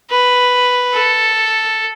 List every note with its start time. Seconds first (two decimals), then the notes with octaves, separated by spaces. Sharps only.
0.11 B4
0.95 A4